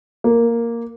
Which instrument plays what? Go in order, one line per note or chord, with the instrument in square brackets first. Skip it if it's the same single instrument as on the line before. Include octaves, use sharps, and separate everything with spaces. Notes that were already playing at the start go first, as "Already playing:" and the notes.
[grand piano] A#3